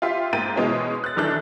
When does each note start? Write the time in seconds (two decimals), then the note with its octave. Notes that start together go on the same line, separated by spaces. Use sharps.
0.02 F4 G4 E5 C6
0.33 G#2 A#3 G5 A6 D#7
0.56 B2 E3 G#3 B3 C#4
1.04 F#6 A6
1.17 A#1 D#3 E3 D4 A4 F#6